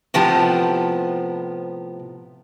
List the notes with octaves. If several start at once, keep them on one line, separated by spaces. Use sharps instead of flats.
A2 C3 F3 B3 G4 A5